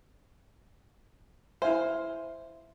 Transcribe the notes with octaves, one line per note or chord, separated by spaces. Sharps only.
E4 C5 E5 F5 G#5